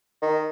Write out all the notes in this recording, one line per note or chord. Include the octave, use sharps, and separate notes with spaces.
D#3